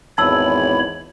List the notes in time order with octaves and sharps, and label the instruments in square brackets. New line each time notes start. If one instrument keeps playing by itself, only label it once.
[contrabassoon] G#1 [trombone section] E2 [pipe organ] C#5 B5 [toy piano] A5 E6